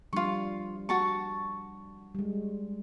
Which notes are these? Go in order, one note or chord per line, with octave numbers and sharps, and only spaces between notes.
F3 G3 D4 F4 C#6
F#4 A5 C#6
G3 G#3